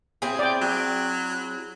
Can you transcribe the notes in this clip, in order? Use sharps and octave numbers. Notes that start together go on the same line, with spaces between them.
C4 E4 G#4
D5 G5
F#3